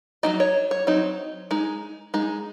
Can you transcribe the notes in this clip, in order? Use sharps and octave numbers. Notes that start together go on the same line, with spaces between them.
F#3 C4 D#4 D#5
C#5
C#5
F#3 C4 D#4
G#3 D#4
G#3 D#4